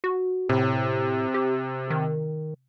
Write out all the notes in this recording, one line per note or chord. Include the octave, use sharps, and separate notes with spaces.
F#4
A2 C3
G4
D#3